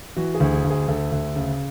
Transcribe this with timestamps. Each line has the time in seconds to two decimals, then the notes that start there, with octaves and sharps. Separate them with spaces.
0.16 E3 F#4
0.35 G#4
0.40 D2
0.53 G#4
0.64 D2
0.70 G#4
0.88 D2 A4
1.12 D2
1.36 C#3